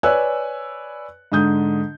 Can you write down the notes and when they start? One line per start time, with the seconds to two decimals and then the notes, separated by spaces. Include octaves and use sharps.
0.03 B4 C#5 D5 G#5 E6 F#6
1.32 G#2 D3 D#6 G6